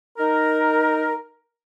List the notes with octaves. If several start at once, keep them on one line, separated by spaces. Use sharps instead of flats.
D#4 A#4